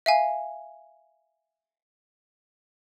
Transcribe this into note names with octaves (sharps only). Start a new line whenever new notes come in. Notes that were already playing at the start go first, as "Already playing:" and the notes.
E5 F5 G#5